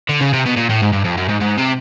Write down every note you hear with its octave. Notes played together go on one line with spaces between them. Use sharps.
D3
C#3
C3
B2
A#2
A2
G#2
G2
F2
F#2
G#2
G#2
C3